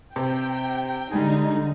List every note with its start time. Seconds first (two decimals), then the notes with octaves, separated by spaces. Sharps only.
0.16 C3 G5
1.11 D3 G3 G#3 D#4 G#4